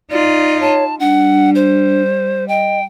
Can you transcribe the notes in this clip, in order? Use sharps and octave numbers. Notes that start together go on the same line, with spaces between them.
D#4 F4 D5
C#5 A5
G3 D4 F#5
C5
D#5 G5